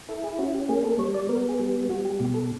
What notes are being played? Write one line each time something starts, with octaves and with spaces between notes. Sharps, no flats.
E4 A4
G#4
C#4 F#4
G4
A#3 G#4
A4
G3 C#5
D5
B3 A#4
G#4
G3
G4
G3 F#4
G4
B2 G4
A4